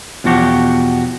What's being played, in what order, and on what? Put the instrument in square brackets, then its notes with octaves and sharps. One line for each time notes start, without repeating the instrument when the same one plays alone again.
[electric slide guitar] E2 B2 F3 F#4 G4